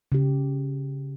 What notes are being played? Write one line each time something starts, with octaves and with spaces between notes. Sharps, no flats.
C#3 G4